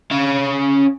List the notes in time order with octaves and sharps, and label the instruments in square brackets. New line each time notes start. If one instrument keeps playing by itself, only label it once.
[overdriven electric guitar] C#4 F5